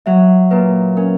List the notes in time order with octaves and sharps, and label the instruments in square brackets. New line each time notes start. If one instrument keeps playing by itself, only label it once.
[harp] F#3 [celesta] E5
[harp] A#2 [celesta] B4
[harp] C#4 [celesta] A#4